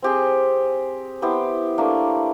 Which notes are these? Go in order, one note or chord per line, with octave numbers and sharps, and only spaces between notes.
C4 G4 G#4
B3 E4 G4 C5
A3 A#3 D4